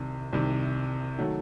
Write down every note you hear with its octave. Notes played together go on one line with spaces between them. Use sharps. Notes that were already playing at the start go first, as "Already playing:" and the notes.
Already playing: C2 C3 D#3
C2 C3 D#3
D#3 F#3 A3